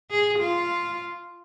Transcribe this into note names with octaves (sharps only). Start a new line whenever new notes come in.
G#4
F4